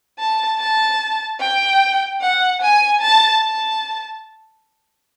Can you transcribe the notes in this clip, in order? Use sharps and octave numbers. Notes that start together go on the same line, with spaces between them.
A5
A5
G5
F#5
G#5
A5
A5